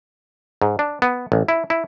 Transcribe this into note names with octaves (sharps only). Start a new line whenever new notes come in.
G#2
D4
B3
A1
E4
E4